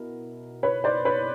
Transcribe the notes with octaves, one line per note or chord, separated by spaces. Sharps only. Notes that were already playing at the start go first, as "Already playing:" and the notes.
Already playing: B2 E4 A#4
B4 C#5
C5 D5
B4 C#5